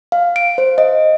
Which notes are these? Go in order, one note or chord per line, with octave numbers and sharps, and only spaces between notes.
F5
D7
C5
D#5